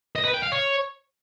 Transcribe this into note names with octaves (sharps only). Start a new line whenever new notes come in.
D#5
B4
G5
F5
C#5